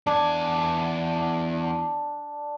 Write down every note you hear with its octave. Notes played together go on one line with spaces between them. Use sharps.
E2 D4 G#5